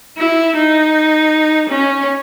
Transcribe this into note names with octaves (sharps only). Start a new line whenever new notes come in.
E4
D#4
C#4